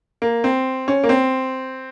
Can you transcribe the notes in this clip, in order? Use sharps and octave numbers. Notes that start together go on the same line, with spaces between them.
A#3
C4
C#4
A#3
C4